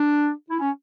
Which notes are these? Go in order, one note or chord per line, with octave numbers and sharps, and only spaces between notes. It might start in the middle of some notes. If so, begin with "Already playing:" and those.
Already playing: D4
E4
C#4